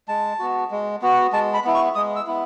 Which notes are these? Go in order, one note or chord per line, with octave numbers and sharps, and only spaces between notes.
G#3 A5
B3 F#4
G#3
B3 F#4
G#3 A5
B5
B3 E4
C#6
G#3 D#6
E6
B3 E4